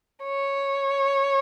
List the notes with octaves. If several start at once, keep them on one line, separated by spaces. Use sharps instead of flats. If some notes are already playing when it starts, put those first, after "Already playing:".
C#5